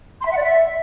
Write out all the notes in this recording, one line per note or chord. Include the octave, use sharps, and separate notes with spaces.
C6
E5
F#5
D5
E5